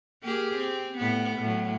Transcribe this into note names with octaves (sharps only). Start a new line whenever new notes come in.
A#3 G4 G#4
C4
A2 B3
A2 F#3